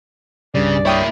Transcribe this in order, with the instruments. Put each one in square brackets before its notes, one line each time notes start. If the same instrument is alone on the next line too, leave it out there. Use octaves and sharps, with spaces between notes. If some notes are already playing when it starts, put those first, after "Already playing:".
[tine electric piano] C2 G2 G3 [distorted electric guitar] C#3 [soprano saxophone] D5
[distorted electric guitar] A#3 E4 [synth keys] C#5 G5 D#6